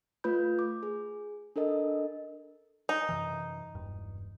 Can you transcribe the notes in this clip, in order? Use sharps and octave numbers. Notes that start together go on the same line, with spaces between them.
A3 F4 B4 B5 G6
D6
G#4
D4 A4 A#4 D#5
D#4
F#2 C3 E3
E1 G2